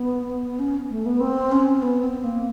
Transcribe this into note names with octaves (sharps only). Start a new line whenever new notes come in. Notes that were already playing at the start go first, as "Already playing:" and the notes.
Already playing: B3
C#4
A3
B3
C4
C#4
C4
B3
C4
A#3